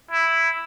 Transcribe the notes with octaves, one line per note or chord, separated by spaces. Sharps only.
E4